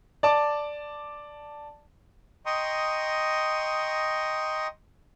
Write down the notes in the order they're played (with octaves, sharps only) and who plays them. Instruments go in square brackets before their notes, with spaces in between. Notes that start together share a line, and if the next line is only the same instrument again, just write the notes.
[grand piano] D5 A5 D6
[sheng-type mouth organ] D#5 G5 A#5 C6 C#6 D#6